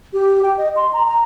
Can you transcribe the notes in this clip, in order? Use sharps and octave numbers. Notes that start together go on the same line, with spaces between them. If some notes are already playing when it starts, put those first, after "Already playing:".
G4
G5
D#5
C6
A#5
A#5